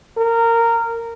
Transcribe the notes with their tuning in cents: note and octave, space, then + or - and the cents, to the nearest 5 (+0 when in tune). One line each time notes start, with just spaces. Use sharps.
A#4 -15